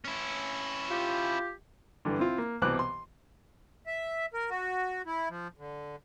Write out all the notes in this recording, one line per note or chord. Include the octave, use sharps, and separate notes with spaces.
C#4 E4
F4 G4
G2 D3 E3
C4 E4 F4
A#3
C2 B2 E3 C5 D6 F#6
C6
E5
A#4
F#4
E4
F3
D3